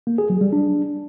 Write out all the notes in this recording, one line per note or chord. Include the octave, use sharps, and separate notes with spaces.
A#3
G#4
F#3
G3
D4